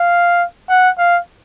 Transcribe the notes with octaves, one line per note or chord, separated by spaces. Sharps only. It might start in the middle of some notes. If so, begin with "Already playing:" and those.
Already playing: F5
F#5
F5